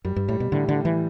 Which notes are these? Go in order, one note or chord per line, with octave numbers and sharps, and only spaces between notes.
F#2 G3
G2
A2 G3
B2
A2 D3
D3
G3
E3